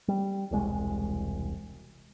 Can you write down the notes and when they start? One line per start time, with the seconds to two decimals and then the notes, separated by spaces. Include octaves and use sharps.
0.08 G3
0.51 E1 C2 G#3